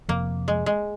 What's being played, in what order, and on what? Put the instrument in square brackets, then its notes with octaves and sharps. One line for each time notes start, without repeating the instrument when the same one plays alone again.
[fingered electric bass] F2 C3 F3 [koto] A#3
[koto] G#3
G#3